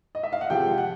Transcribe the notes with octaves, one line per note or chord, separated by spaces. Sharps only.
D#5
E5
F5
F#5
C3 F3 G#3 G5
F#5